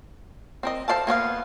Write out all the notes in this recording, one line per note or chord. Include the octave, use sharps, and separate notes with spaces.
C4 A#4 D#5
A4 C5 D5 F5 A5
A#3 B3 C#5 F5